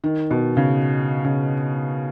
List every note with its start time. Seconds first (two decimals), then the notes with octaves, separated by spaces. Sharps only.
0.04 D#3
0.31 B2
0.57 C#3
1.25 C#3